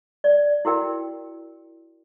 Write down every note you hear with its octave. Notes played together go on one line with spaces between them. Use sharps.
D5
E4 F#4 A#4 G5